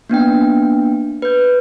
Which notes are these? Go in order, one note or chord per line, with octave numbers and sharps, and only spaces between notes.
A#3 B3 D4 G5
B4 G6